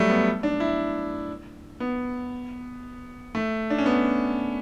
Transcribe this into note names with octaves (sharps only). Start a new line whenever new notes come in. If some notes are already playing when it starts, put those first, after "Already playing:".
Already playing: F#3 G3 A3
B3
D4
E4
B3
A3
D4
C#4
B3